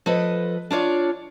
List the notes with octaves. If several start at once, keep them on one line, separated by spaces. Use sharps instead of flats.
F3 A4 B4 D#5
D4 F4 C#5 D5